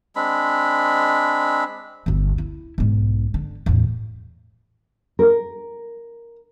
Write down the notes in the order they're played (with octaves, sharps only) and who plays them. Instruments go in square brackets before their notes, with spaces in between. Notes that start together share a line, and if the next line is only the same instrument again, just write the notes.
[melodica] G#3 C4 D4 B5
[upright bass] G1 D2
E4
B1 G#2
D3
E2 A2
[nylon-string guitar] A#4